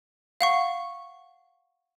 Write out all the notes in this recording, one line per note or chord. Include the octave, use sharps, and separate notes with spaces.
F5 F#5 C#6